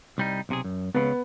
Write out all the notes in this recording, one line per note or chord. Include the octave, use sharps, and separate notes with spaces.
C2 G3 D#4
B1 C3 G#4
F#2
C#2 C#3 B3